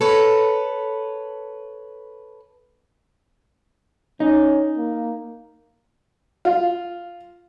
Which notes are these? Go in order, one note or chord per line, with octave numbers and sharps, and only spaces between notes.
A4 B4 C#5
C#4 D#4
A#3
F4